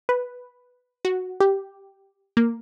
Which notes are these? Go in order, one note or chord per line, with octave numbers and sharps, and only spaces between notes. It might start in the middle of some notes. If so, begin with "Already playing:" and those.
B4
F#4
G4
A#3